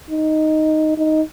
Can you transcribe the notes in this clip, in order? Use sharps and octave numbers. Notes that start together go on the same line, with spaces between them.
D#4
D#4